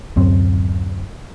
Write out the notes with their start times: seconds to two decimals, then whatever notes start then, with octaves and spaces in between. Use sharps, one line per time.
0.16 D1 F#2 C4